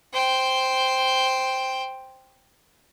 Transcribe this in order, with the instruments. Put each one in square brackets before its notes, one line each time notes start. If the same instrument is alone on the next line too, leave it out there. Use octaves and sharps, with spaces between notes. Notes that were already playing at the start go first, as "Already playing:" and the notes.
[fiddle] C5 G5